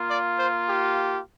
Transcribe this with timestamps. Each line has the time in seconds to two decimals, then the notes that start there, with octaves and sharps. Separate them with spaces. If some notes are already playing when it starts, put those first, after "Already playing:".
Already playing: A#3 F4
0.09 D5
0.38 C5
0.67 G4